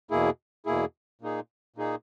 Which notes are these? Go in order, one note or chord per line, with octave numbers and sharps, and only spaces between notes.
E2 B2 A#3 E4 G#4
E2 B2 A#3 E4 G#4
A#2 A#3 D#4 G#4
A#2 A#3 D#4 G#4